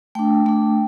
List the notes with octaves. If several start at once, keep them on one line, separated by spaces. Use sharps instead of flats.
A3 D4 G5
A3 D4